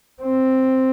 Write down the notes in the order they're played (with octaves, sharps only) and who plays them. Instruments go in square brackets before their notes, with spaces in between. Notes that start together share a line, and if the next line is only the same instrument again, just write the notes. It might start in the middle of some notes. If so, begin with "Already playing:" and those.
[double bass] C4